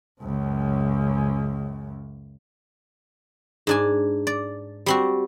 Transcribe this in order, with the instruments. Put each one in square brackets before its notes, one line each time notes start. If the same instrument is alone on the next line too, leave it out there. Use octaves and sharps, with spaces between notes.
[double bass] C#2 F#2
[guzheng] G#2 D4 G#5
D5
G3 C4 F#4